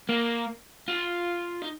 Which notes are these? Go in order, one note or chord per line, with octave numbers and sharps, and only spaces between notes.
A#3
F4
D#4